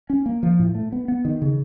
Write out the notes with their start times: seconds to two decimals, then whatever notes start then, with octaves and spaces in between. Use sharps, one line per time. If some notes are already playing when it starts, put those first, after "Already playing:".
0.10 C#4
0.26 A#3
0.43 F3
0.59 A2
0.75 A3
0.92 B3
1.08 B3
1.25 D#3
1.42 C#3